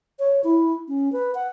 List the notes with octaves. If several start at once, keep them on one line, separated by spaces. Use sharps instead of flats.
C#5
E4
C#4
B4
F#5